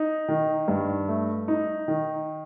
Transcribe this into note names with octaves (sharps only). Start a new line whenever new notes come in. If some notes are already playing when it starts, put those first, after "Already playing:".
Already playing: D#4
D#3
G2
A3
D#4
D#3